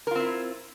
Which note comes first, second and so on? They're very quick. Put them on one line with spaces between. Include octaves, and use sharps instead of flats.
A#4 F4 C4 E4